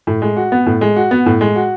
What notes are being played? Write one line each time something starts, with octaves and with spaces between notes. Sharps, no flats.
A2
G#3
F#4
B3
A2
G#3
F#4
B3
A2
G#3
F#4